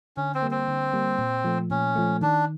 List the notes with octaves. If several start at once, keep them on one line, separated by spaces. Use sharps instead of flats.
D3 C#4
C4
G3 A#3
C4
D3
G3 A#3
A#2
F3 A3
A#2 C#4
F3 A3
D#3 D4